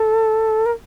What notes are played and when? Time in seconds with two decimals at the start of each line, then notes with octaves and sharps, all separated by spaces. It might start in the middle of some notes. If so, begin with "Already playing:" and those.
Already playing: A4
0.66 A#4